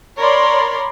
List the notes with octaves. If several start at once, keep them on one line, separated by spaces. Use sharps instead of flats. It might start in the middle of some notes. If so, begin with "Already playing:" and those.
A#4 C#5 D5 B5 C6